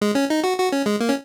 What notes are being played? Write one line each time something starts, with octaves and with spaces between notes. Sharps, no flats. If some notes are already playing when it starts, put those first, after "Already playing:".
G#3
C#4
D#4
F#4
F#4
C#4
G#3
A#3
C#4